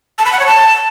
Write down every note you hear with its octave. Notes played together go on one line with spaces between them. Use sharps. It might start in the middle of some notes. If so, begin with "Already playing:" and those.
A5
B5
F#5
C#5
A5